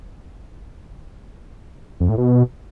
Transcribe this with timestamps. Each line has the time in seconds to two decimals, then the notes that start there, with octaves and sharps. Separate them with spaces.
2.00 F2
2.09 A2
2.18 B2